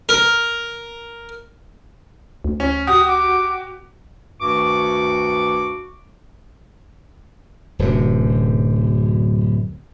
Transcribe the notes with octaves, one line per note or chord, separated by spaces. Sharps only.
A#4
D2
C#4
F#4 G4 D#6
D6
D2 G2 D#3 F#4 C#6 D6
D1 F#2 C3